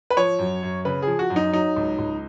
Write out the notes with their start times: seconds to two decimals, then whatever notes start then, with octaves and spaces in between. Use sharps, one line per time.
0.10 B4
0.17 F3 C#5
0.39 F#2
0.63 F#2
0.85 C#3 B4
1.02 F3 G#4
1.19 F#4
1.30 F#2
1.36 D#4
1.53 F#3 D#4
1.76 C#2
1.99 C#2